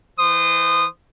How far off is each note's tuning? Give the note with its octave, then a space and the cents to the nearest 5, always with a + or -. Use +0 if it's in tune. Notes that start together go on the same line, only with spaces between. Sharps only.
E3 +0 C5 -25 D#6 -20